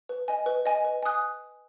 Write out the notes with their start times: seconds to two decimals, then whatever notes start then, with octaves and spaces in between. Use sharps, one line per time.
0.09 B4
0.28 D#5 G#5
0.46 B4
0.66 D#5 G#5
0.84 B4
1.03 G#5 D#6 F#6